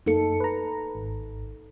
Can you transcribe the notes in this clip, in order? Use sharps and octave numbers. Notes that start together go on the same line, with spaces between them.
F#2 A#3 D#4 A4 C#7
B4 A#5
G#1